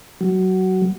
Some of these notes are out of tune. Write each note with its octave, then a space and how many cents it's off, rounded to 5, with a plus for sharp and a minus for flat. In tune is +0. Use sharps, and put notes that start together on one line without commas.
F#3 +15